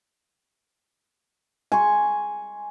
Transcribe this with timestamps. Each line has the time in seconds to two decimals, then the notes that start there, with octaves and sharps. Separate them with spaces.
1.72 G#5 C6 C#6